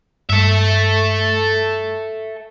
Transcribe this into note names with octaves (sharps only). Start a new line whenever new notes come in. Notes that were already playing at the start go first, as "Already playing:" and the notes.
G2 A4 E5